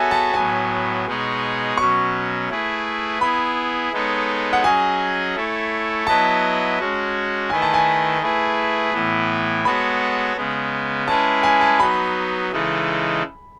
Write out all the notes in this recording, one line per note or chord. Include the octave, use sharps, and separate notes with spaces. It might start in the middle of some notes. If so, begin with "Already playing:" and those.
Already playing: B3 F#4 A4 C#5 E5 G#5 A5
A5
A2 F#3 B3 G#5
B2 G#3 D#4 G#4 C#5
B2 F#3 C#4 C#6
A3 E4 G#4 B4
B3 E4 G#4 B5
G#3 B3 D#4 A4 C#5
F#5
F#3 C#4 G#4 D#5 G#5
A3 E4 A4 C#5
F#3 B3 E4 B4 D#5 A5
G#3 C#4 F#4
D#3 A3 E4 B4 D#5 G#5
A5
G#5
A3 E4 G#4 B4
A2 E3 B3 E4
G#3 B3 F#4 A4 C#5 B5
C#3 G#3 B3
G#3 C#4 E4 G#4 B4 A5
G#5
A5
F#3 B3 D#4 B5
C#3 E3 G#3 D#4 A4